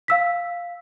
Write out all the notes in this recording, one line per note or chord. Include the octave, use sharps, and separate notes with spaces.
F5 E6 B6